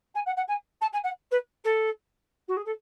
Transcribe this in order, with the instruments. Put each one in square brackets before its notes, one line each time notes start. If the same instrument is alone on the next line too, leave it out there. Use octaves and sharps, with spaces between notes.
[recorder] G#5
F#5
F#5
G#5
A5
G#5
F#5
B4
A4
F#4
G#4
A4